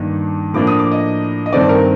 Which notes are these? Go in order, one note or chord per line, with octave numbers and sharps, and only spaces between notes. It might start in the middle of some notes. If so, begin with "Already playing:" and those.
Already playing: G2 D#3 A#3 D4
A2 F3 A#3 D4 D6
D#6
D6
D#5
D#5
G2 D#3 A3 C4 D5
A#4